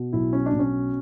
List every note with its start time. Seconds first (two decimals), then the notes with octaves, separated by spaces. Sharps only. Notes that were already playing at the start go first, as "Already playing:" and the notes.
Already playing: B2
0.13 B1 E4
0.33 C#4
0.46 D4
0.53 B2
0.59 C#4